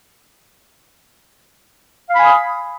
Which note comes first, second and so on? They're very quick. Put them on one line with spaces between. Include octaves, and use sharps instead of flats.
F5 B5 G#5 D#6